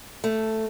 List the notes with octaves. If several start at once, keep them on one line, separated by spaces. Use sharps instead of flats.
A3